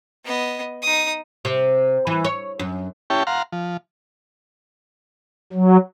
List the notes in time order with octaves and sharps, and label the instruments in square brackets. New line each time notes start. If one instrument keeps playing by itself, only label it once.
[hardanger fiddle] B3 D#5
D#4 D#6
[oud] C3
E3
C#5
F#2
[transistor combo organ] C#4 E4 G4 C#5 G5 A5
F5 F#5 A#5 C6
F3
[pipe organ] F#3